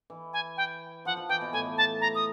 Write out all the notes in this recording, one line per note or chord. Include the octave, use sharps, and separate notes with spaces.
E3
G#5
G5
F3 F#5
F3
E3 G5
B2
A2 G#5
A5
A#5
D#6